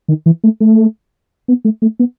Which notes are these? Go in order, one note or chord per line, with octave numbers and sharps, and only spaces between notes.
D#3
E3
A3
A3
B3
A3
A3
B3